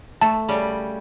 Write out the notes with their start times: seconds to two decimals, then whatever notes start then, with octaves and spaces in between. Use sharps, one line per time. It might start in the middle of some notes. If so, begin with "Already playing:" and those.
0.21 A3 A5
0.48 C#3 G3 C#4